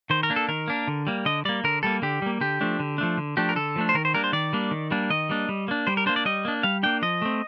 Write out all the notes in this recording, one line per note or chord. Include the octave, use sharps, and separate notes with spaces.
D#3 C5
A#4
A#3 D4
A4
D#3 A#4
A#3 D4
D3
G3 A#3
D3 D#5
G3 A#3 D5
D3 A#4
G3 A#3 A4
D3 G4
G3 A#3
D3 G4
F3 A3 D4
D3
F3 A3 D4
D3
F3 A3 D4 G4
A#4
D3 A4
F3 A3 D4
C5
D#3 A#4
C5
G3 A#3 D4 A#4
C5
D#3 D5
G3 A#3 D4
D#3
G3 A#3 D4
D#3 D#5
G3 A#3 D4
G3
A#3 D4
G3 C5
A#4
A#3 D4 C5
D5
G3 D#5
A#3 D4
G3 F5
A#3 D4 G5
F3 D#5
A3 C4